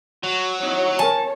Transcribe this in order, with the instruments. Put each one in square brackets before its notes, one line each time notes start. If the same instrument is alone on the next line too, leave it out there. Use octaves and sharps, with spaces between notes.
[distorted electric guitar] F#3
[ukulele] D#4 E4 [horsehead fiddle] C#5
[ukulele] A#4 G#5 [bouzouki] A5